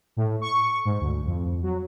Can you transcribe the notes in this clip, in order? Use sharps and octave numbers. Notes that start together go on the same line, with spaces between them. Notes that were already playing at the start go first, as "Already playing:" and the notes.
A2
C#6
G#2
D2
F2
F#3